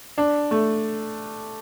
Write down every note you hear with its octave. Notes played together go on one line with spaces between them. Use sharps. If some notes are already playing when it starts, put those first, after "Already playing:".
D4
A3